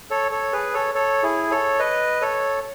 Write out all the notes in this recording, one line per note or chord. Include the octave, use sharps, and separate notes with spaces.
A4 C#5
A4 C#5
G#4 B4
A4 C#5
A4 C#5
E4 G#4
A4 C#5
B4 D#5
A4 C#5